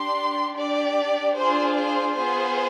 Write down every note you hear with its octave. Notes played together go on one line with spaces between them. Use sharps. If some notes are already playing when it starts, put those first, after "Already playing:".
Already playing: D4 G4 C6
D4 G4 D5
D4 F4 G#4 C5
C5
B3 F4 G#4 C5